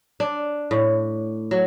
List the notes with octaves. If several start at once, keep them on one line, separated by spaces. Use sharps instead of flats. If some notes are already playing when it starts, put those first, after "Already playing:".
D4
A2
F#3